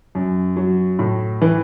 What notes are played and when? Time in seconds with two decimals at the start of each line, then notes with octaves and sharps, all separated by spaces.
0.15 F#2
0.57 F#3
0.99 A2
1.42 E3